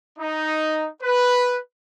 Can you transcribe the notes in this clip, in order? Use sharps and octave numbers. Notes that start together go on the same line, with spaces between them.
D#4
B4